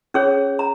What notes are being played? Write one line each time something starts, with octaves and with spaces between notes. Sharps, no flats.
C#4 G#4 C#5
A#5